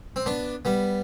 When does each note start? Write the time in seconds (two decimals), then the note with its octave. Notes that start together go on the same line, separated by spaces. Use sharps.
0.16 C4
0.26 B3 D4
0.65 G3 B3